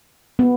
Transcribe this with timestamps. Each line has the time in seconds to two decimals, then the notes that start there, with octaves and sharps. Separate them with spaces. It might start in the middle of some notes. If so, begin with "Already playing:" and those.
0.39 B3